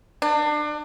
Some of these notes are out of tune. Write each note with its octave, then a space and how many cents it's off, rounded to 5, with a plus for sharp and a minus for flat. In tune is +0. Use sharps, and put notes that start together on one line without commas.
D4 +30